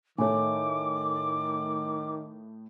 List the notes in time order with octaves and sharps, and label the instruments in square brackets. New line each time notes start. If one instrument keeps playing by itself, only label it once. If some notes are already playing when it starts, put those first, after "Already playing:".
[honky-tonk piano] A2 A3 [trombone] D#3 [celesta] C#5 G#5 [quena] D6